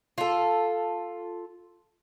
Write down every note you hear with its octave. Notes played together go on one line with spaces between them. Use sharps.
F4 A4